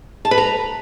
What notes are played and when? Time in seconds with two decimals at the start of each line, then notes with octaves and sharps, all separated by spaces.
0.25 A5
0.31 B4
0.38 A#5